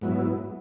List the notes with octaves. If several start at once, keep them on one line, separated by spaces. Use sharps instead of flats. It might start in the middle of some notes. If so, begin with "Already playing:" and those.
G#2 F#3 B3 E4